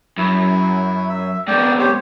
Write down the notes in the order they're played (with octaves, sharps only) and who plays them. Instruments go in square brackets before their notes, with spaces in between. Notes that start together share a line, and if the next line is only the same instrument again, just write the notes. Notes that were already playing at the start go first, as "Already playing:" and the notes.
[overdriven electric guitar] F#2 [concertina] E4
[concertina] E5
[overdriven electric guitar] G#2 B2 [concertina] D5 G5
[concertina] G4 C5 C#5